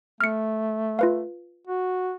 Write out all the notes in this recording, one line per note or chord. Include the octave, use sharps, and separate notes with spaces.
A3 F6 C#7
F4 B4 F5
F#4